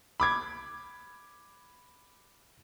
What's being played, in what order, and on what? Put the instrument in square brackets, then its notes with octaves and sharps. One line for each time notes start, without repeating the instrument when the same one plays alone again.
[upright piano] B5 D6 G#6